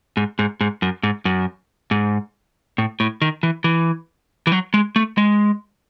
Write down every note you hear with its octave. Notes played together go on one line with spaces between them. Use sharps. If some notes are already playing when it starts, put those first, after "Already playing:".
G#2
G#2
G#2
F#2
G#2
F#2
G#2
A2
A2
D#3
E3
E3
E3
F#3
G#3
A3
G#3